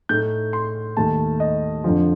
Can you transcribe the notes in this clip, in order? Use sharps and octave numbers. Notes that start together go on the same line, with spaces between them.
A2 A3 D#4 G6
C6
D#2 D#3 A3 A5
D#5
F2 D3 F3